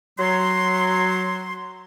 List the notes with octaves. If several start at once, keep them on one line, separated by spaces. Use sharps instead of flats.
F#3 C6